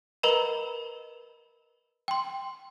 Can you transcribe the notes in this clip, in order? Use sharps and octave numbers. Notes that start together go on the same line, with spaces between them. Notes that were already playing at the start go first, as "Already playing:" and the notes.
A#4 B4 D#5 A#5 B5
G5 C6